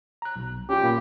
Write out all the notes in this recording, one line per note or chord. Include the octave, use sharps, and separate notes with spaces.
A#5 F#6
B1
C#4 F4 G4
A#2 A#3 B5